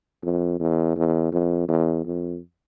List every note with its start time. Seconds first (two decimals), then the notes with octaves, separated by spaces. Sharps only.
0.24 F2
0.60 E2
0.96 E2
1.32 F2
1.68 E2
2.05 F2